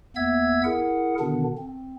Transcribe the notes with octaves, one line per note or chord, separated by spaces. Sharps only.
E2 A#3 B3 E5 E6 G#6
E4 G#4 A#4 F#5
B2 D3 D#3 B3 D4
C4